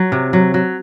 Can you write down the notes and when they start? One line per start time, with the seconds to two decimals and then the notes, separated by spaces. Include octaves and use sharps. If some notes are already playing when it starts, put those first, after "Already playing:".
Already playing: F#3
0.12 C3
0.33 F#3
0.54 F#3